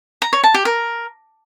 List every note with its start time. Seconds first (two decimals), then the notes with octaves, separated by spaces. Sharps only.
0.22 A#5
0.33 C#5
0.44 A5
0.54 G4
0.65 A#4